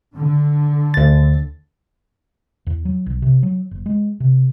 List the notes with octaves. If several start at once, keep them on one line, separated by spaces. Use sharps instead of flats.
D3
D2 A6
E2
F#3
B1
C3
F#3
F#1
G#3
C3